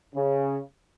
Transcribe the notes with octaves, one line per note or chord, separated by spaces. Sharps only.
C#3